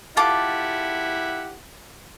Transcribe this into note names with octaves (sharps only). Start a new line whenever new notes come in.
E4 F4 G4 A4 F#5 D6